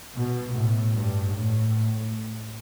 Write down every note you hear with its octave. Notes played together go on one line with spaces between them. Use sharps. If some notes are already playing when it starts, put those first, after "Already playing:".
B2
A2
G2
A2